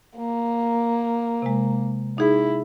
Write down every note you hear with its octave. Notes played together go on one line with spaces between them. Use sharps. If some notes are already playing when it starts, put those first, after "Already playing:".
A#3
C3 G#3
D#4 E4 G#4